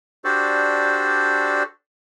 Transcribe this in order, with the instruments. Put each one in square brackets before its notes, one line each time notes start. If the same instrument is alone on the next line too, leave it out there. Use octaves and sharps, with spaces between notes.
[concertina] D4 F#4 G4 A4 C5 D5